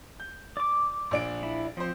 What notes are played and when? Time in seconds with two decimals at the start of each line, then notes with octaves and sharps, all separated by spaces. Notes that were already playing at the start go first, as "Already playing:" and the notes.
0.20 G6
0.57 D5 D6
1.11 A#1 D4 D7
1.43 E4
1.77 F3 C4 C5